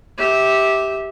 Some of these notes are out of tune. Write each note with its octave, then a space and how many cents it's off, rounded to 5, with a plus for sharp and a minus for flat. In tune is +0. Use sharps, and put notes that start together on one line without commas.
G4 +0 E5 -20